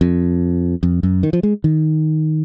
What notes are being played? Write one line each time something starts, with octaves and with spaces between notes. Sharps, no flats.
F2
F2
F#2
D#3
F3
G#3
D#3